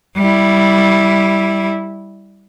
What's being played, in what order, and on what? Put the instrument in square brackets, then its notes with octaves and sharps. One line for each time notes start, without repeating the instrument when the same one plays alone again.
[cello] G3 E4